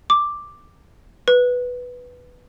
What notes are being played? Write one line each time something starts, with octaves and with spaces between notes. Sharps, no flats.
D6
B4